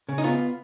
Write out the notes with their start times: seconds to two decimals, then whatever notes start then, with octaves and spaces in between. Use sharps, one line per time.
0.09 C#3
0.18 D#4
0.24 B3 F4